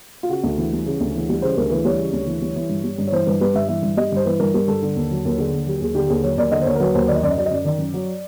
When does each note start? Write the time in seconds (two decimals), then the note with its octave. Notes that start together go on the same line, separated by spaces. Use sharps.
0.23 F4
0.29 C#3 F#4
0.43 D2
0.58 E3
0.73 G3
0.86 C#3
1.01 D2
1.15 E3
1.29 G3
1.42 C#3 C5
1.57 D2 A#4
1.70 E3 B4
1.85 G3 C#5
1.99 C#3
2.13 D2
2.27 E3
2.41 G3
2.56 E3
2.69 G2
2.84 G3
2.98 G2
3.08 C#5
3.12 E3 C5
3.27 G2 B4
3.41 G3 B4
3.55 G2 E5
3.68 E3 E5
3.83 G2
3.97 G3 D#5
4.12 G2 C5
4.25 E3 B4
4.40 G2 A#4
4.54 G3 A#4
4.68 G2 A4
4.82 D3
4.96 D#2
5.11 F#3
5.25 D#2
5.38 D3 G#4
5.53 D#2
5.66 F#3 G4
5.81 D#2 G#4
5.95 D3 G4
6.09 D#2 G#4
6.23 F#3 C#5
6.38 D#2 D5
6.52 D3 D#5
6.62 C5
6.66 D#2 C#5
6.76 A#4
6.80 F#3 B4
6.94 D#2 C5
7.08 D#3 D5
7.15 D#5
7.23 F#2 D5
7.30 D#5
7.37 F#3 D5
7.46 D#5
7.51 F#2 D5
7.64 D#3 D5
7.79 F#2
7.94 F#3